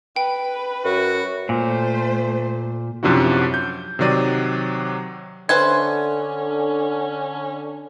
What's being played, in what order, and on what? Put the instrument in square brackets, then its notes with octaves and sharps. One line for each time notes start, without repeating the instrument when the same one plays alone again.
[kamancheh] B4 [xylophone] G5
[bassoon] F#2 [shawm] F#4
[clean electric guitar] A#2 [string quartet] A3 C5
[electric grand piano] F#2 C3 F3 D4 E4 F#4
G6
C3 D#3 F#3 D5 D#7
[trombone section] D3 [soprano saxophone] C#4 [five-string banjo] B4 C5 E5 [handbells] G#6